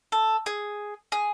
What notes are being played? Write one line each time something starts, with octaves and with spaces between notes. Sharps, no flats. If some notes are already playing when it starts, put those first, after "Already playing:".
A4
G#4
G#4